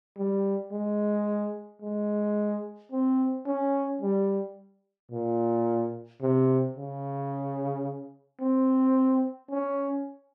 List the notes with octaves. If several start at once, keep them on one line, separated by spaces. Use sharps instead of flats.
G3
G#3
G#3
C4
C#4
G3
A#2
C3
C#3
C4
C#4